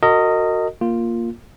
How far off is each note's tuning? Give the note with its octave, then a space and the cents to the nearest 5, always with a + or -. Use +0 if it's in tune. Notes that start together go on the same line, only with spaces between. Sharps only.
F#4 +0 A#4 -35 D#5 +0
A#3 +0 F4 +0